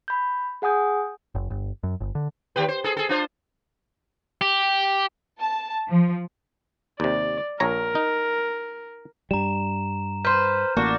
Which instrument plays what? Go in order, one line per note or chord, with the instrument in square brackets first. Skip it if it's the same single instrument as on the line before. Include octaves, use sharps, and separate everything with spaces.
[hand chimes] B5 G6
G#4 F#5 G#5 D#6 G6
[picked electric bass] F#1
G1
F#2
G1
D3
[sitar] D#2 G4 B4
C5
G#4 A4
G#4 A4
D4 F4 C5
[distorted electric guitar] G4
[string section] A5
F3
[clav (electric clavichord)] D#2 C3 [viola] D5
[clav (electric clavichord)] A#1 C#5 A#5 [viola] A#4
[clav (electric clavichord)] D#4
[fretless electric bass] G2 G3 [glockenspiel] A#5 E7
[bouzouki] B4 C5 [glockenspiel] A#5 F6 G6
[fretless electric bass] A1 A#3 [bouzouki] D4 F#4